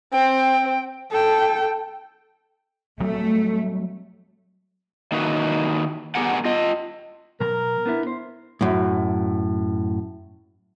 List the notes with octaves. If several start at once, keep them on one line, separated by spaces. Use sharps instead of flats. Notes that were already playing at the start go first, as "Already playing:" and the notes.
C4 G5
A4 G5
F#3 G3 A3 C4
D#3 A#3 D#4 E4 F#4 B4
B3 G4 G#4 A#4 F#5
F4 D#5
B2 F#3 A#4 A#5
B3 D4 E4
C5
F#2 A2